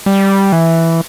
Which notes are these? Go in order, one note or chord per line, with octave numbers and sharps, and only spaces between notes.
G3
E3